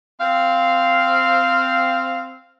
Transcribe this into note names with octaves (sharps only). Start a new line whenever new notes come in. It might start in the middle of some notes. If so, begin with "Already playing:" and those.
C4 F5